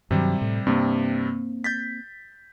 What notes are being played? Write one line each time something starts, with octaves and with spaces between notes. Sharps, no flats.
G2 C3 D#3 F#3 G3
A2
G2 C3 A#3 C4
G6 A6 B6